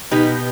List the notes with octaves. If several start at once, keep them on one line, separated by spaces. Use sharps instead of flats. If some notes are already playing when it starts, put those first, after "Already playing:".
B2 B3 D#4 G4